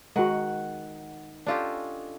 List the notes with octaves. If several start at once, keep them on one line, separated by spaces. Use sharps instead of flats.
D#3 G#3 F#4 F#5
C#4 D4 F4 G4 A4 D#5